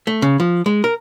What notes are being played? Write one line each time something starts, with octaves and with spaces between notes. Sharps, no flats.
A3
C#3
F3
G#3
A#4